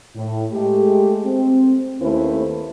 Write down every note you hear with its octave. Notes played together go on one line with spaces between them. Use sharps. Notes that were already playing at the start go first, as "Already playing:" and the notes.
A2
G#3 A3 G4
C4
D#2 A3 C#4 E4 B4 C5